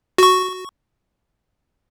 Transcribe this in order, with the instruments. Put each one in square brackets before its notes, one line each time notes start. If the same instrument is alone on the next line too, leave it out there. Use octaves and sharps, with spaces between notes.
[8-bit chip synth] F#4 C#6